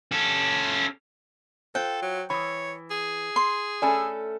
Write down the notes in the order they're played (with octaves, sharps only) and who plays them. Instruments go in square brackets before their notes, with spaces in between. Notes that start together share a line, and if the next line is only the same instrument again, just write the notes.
[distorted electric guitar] C#4 A4
[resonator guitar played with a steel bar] F4 [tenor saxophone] A4 [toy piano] C5 [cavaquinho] G5
[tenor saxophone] F#3
[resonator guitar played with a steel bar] E3 [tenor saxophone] C#5 [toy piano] B5 D#6
[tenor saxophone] G#4
[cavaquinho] C6
[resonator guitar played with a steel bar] A3 C#4 A4 [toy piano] D5 G#5 B5